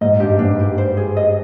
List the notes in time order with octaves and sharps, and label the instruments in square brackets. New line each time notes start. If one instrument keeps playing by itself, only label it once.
[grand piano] G#2 [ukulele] D#5
[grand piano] G2 [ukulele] G4
[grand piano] G#2 [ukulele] D4
[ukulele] G4
C5
G#4
D#5